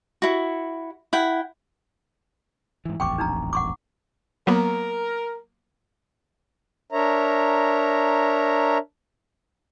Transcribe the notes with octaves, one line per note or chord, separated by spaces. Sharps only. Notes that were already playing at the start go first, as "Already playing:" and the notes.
E4 F#4
E4 F#5 G5
G#2 E3
D#1 A1 F2 G5 C#6 D6
D4 D#4 A#5
F#5 C#6 D6
F#3 A#3 B3 A#4
D4 A#4 C#5 E5 A#5